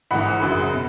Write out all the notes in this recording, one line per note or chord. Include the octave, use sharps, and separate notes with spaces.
G#1 G#2 E3 F#5 B5
G#1 F#2 C#3 F#3
B2